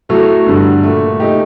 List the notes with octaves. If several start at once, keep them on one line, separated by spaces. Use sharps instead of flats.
A2 F#3 A3 F#4 A4
G2 D3 G3
A#2 A3
A#2 A3 D#4 G4